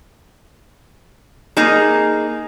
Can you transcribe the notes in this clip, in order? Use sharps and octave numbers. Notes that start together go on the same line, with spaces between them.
A#3 D#4 G#4